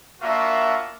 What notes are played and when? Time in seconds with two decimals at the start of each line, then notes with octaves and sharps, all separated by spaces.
0.22 A#3 D4 F4 F#4 A#4 E5